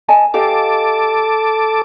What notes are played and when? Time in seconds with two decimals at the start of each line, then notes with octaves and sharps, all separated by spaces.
0.08 D#5 G#5 A5
0.34 G4 A4 D#5 F5 D6